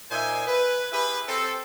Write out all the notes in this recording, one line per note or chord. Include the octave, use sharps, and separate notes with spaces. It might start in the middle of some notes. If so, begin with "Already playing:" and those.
A#2 D#4 C5 E5 G#5
B4
E4 G4 G#4 B4
C4 A4